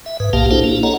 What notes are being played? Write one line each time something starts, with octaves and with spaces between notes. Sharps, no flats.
E5
G#2 B4
B1 A#2 A#3 G4 F5 A5
D4 E4 F#4 G4 A4 C5
A#3 D4 E4
A4 C#5 D#5 F#5 A#5